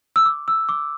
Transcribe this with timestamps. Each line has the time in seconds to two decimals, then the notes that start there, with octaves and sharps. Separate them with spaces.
0.16 E6
0.25 D6
0.48 E6
0.69 D6